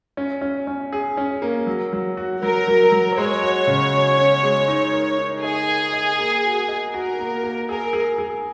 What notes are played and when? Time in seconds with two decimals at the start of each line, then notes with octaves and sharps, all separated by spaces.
0.17 C#4
0.41 C#4
0.67 C#4
0.93 G#4
1.17 C#4
1.42 A#3
1.67 F#3
1.93 F#3
2.17 F#4
2.42 F#3 A#4
2.67 F#3
2.92 F#3
3.17 G#3 C#5
3.42 F#4
3.67 C#3
3.93 F#4
4.17 C#4
4.43 G#3
4.68 D#4
4.93 A#4
5.18 D#4
5.43 G#4 D#5
5.68 A#4
5.93 D#5
6.19 A#3
6.44 F#4
6.68 D#5
6.94 F#4 A#4
7.19 A#3
7.43 A#3
7.69 G#4 A#4
7.93 G#4
8.18 G#4